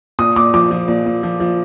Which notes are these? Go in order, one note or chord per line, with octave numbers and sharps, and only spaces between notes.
A#2 D#6
A#2 D6
F3 D6
F3
A#2
A#2
F3
F3